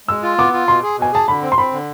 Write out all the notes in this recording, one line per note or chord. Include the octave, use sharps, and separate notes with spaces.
G#3 E6
F4
B3 D6
F4
B2 C6
G#4
B2 G#5
G#4 A5
D3 B5
C4
C6
C4 B5
D3